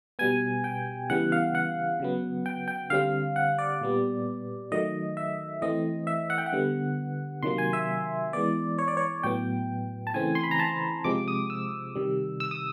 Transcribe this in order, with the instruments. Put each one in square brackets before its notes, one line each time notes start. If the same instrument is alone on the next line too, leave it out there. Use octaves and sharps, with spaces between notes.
[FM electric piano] B2 G3 B3 G#5
G5
C#3 E3 G3 B3 F#5
F5
F#5
C#3 F#3 B3
G5
G5
D3 G3 C4 F5
F#5
D5
A#2 G3 B3
D#3 F#3 A3 D#5
E5
E3 A3 C4 D#5
E5
F#5
G5
F#5
D3 G3 B3
C3 D#3 F#3 A#3 C6
G#5
E5
E3 G#3 B3 D5
C#5
D5
C#5
A2 F#3 B3 G5
A5
C#3 E3 A3 C4 G#5
C6
B5
A#5
A5
C3 F3 G#3 C4 D6
D#6
E6
C3 D#3 G3
E6
D#6